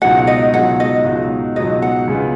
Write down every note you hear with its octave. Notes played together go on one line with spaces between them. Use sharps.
C#2 B2 F#3 D#4 F#4 F#5
D#5
C#2 B2 F#3 D#4 F#4 F#5
D#5
C#2 B2 F#3 D#4 F#4
C#2 B2 F#3 D#4 F#4 D#5
F#5
C#2 C#3 G#3 B3